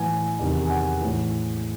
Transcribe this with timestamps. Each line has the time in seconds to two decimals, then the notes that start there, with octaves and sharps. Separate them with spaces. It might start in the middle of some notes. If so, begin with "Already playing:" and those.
Already playing: A2 E3 F#5 G#5
0.39 E2 C3 D#3
0.65 G#5
0.70 F#5
1.01 A2 E3